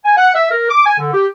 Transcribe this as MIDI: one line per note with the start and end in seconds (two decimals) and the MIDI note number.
0.04 0.14 80
0.16 0.31 78
0.34 0.50 76
0.51 0.69 70
0.70 0.86 86
0.86 0.96 80
0.98 1.10 50
1.13 1.26 67